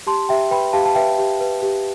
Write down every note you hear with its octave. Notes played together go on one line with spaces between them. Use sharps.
G4 A5 C6
G4 E5 G5
B4 G5 B5
G4 F5 A5
A5
B4 E5 G5
G4
B4
G4